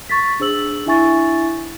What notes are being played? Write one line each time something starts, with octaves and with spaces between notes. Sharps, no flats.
C#6 A6 B6
D4 G#4 C5 E6 F#7
D4 E4 E5 G#5 C#6 A6